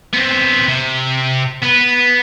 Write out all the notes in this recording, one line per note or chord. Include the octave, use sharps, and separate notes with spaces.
B3 C4
C3
B3 B4